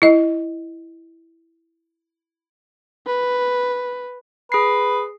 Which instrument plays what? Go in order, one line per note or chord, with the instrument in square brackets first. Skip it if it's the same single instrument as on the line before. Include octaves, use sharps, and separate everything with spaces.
[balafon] E4 D#5
[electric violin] B4
[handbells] G#4 C7 [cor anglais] B4